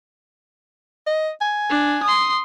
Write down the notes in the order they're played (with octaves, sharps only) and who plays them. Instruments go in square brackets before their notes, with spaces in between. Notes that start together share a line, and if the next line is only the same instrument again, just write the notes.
[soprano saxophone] D#5
G#5
[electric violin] D4
C6 D#6